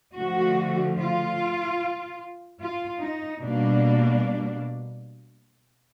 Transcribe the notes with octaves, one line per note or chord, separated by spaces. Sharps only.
D3 F3 A3 F#4
F4
F4
D#4
B2 G3 A#3 D4